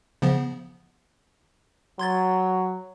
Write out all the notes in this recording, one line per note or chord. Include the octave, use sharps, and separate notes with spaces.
C#3 F3 B3
F#3 C6 G#6 A6